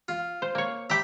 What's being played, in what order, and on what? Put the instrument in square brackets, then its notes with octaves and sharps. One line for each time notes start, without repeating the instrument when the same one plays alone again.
[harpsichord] F4
[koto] C5
A#3 C#5
[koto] G4 A#5 [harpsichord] E5 B5